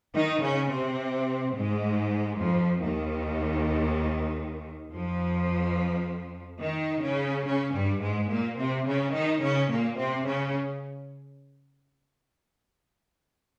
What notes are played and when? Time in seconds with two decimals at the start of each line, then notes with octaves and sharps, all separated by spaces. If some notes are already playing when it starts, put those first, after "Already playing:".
0.14 D#3 D#4
0.43 C#3 C#4
0.71 C3 C4
1.55 G#2 G#3
2.40 F2 F3
2.82 D#2 D#3
4.92 F2 F3
6.61 D#3 D#4
7.03 C#3 C#4
7.45 C#3 C#4
7.73 G2 G3
8.01 G#2 G#3
8.30 A#2 A#3
8.58 C3 C4
8.86 C#3 C#4
9.14 D#3 D#4
9.42 C#3 C#4
9.70 A#2 A#3
9.98 C3 C4
10.26 C#3 C#4